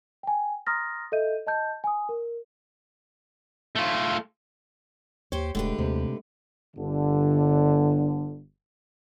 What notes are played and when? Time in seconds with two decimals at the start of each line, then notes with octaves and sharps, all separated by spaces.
0.23 G5 G#5
0.67 A#5 C6 D#6 F6 A6 A#6
1.12 A4 D#5 E5 G6 D#7
1.47 D#5 A5 G6
1.84 G#5 D#6
2.09 A#4
3.75 A3 F4
5.32 D#2 G4 C5 C#5
5.55 E1 D3 G#3 A3 G4 B4
5.79 D#2 C3
6.75 G1 D3